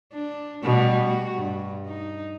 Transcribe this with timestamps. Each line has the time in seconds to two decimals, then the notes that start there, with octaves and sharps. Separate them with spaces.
0.13 D4
0.63 B2 G3 A3
1.03 F#4
1.35 G2
1.86 D#4